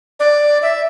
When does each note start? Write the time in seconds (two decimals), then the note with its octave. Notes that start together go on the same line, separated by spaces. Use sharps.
0.20 D5
0.62 E5